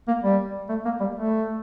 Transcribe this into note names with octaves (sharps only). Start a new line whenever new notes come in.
A#3
G3
A3
A#3
G3
A3